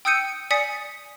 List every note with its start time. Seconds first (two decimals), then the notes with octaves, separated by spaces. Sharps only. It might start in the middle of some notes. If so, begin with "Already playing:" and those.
0.05 G5 D#6 E6 G6 C#7 D#7
0.51 D5 G#5 D#6 B6 C#7